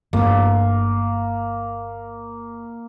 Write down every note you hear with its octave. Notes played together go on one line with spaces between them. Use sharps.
G1 G2 A3 A#3